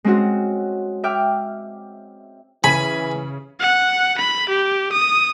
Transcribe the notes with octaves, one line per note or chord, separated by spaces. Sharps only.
G#3 C4 C#4 F#4
E5 G5 D6 F6
C#3 E3 G#5 B5 D#7
F#5
B5
G4
D#6